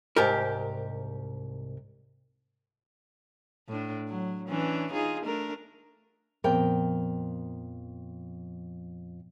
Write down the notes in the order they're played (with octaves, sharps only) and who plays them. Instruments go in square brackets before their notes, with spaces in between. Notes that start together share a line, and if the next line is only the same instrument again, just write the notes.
[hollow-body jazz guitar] C2 G#2 G4 A#4
[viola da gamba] A2 D4
F#3
E3 C#4 D4
D#4 F4 G#4
A3 D4 A#4
[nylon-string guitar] F2 A#4 G5 [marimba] A#2 F3 B3